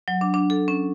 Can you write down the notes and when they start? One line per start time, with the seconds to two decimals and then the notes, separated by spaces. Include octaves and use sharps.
0.08 F#3
0.21 D4
0.34 D4
0.50 A4
0.68 C#4